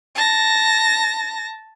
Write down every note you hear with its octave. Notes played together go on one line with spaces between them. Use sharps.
A5 A#6